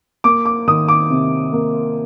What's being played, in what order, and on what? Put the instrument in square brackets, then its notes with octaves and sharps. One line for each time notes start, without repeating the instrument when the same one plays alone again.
[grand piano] A#3 D6
D6
D#3 D#6
D6
C3
A#3